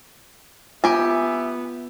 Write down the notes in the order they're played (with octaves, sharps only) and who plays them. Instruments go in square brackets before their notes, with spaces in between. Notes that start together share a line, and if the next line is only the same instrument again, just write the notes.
[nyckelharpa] B3 [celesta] F4 [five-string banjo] G4 G#5 [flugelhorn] E5